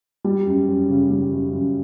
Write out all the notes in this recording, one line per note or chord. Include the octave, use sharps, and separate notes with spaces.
G3
F#2
F#2
C#3
G3
F#2
F#2